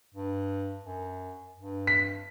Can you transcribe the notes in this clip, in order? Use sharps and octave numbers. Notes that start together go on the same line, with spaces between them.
G2
F#2
G2
B6